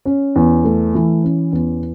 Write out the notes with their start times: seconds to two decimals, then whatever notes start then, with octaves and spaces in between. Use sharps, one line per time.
0.06 C#4
0.36 E2
0.65 A3
0.95 E3
1.24 C#4
1.53 E2